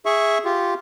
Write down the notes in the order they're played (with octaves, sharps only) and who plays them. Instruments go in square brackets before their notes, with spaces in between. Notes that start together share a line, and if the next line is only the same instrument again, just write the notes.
[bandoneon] G#4 E5 C#6
F4 G4